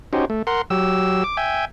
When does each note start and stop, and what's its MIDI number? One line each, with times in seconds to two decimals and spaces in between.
0.13 0.25 61
0.13 0.25 63
0.13 0.25 66
0.13 0.25 67
0.13 0.25 72
0.30 0.42 57
0.47 0.62 70
0.47 0.62 78
0.47 0.62 84
0.70 1.23 54
0.70 1.23 67
0.70 1.23 88
1.24 1.37 86
1.37 1.65 76
1.37 1.65 79
1.37 1.65 80